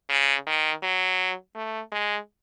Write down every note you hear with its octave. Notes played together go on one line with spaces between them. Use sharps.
C#3
D#3
F#3
A3
G#3